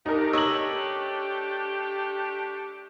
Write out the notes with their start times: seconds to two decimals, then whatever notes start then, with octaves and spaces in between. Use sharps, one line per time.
0.06 A3 D4 D#4 G4 A#4
0.33 C#5 D#5 E6 F#7